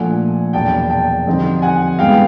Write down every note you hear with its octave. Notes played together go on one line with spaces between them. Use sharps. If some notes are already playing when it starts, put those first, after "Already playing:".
Already playing: A#2 F3 A3 D4 F#5 G#5
E2 B2 F#3 A#3 D4 G5 A5
G5 A5
F2 D3 G3 C4 D#4
F#5 G#5
G2 E3 G#3 B3 F5 G5